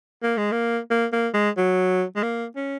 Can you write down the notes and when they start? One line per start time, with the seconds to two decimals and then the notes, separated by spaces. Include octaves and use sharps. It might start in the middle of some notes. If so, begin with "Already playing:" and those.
0.23 A#3
0.37 G#3
0.52 A#3
0.91 A#3
1.13 A#3
1.34 G#3
1.57 F#3
2.16 G#3
2.23 A#3
2.56 C#4